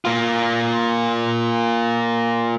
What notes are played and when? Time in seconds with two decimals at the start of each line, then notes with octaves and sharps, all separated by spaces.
0.05 A#3 F4